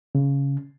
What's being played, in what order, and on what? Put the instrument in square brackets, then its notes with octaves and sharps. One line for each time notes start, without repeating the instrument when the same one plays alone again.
[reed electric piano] C#3